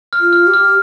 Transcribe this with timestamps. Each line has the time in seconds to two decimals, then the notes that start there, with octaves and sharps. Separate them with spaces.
0.13 F6
0.19 F4
0.33 F6
0.47 G4
0.54 F6